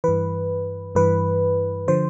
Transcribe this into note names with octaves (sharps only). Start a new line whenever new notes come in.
G2 E3 B4
G2 E3 B4
D3 F3 C5